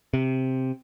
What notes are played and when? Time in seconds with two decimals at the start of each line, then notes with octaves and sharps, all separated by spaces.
0.14 C3